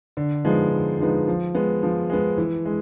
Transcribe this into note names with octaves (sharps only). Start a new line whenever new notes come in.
D3
F3 G#3 B3 D#4
D3
F3 G#3 B3 D#4
F3
G#3 B3
F3
G#3 B3
E3
G#3